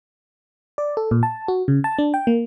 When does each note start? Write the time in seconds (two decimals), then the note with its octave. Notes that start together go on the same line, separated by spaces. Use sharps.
0.78 D5
0.97 A4
1.11 A#2
1.23 A5
1.48 F#4
1.68 C#3
1.84 A5
1.98 D4
2.14 G5
2.27 A#3